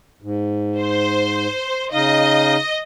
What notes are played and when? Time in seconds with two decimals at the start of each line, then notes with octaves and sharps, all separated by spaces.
0.22 G#2
0.78 C5
1.93 C#3 D#4 D#5 F5